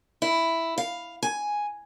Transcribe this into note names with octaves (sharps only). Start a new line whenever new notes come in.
E4
F5
G#5